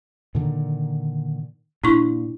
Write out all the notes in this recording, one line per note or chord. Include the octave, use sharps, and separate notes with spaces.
A#2 D3 D#3
A#2 D4 E4 C#6